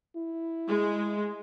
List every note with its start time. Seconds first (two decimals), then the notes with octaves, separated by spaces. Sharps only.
0.17 E4
0.69 G#3